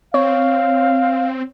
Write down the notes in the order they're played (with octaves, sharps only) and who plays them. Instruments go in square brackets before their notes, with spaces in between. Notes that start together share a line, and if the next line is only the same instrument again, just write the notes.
[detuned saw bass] C4 [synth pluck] C#5 [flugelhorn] F5